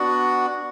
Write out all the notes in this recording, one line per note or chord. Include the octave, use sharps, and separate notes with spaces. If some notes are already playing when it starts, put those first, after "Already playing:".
Already playing: B3 D4 F#4